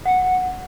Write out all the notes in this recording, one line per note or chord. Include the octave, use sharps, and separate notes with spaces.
F#5